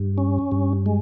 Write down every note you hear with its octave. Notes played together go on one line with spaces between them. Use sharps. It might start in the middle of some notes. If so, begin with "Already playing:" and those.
Already playing: G2
C#4
G2
G#3